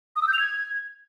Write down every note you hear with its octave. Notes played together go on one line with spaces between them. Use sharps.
D#6
E6
G6
F7
G#6